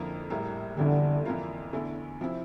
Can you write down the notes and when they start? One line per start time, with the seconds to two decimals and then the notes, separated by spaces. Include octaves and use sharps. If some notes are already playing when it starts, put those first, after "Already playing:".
Already playing: F2 D3 F3 A#3 E4
0.30 A#1 A2 G3 A#3
0.77 G1 F2 D3 E3 G3
1.25 F2 E3 A#3 F4
1.73 E2 D3 A3 E4
2.20 C3 F3 C4 E4